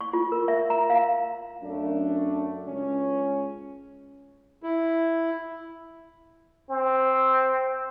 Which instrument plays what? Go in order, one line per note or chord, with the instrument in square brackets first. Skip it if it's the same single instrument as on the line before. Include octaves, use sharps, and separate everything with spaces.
[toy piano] C#6
F4
A#4
E5
A#5
F5
[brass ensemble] F#2 A3 D4
C#2 C#4
[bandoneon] E4
[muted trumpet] C4